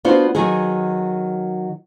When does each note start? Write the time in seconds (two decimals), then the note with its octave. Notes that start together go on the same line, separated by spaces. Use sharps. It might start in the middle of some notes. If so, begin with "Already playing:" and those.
0.05 B3 D4 F4 F#4 C5
0.35 D#3 F#3 G#4